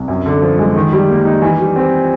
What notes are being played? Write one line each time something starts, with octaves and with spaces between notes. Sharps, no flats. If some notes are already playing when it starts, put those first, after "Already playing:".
Already playing: C2
F#2
D3
F3
G#3
D#3
G3
A#3
D#4
E3
G3
C4
F4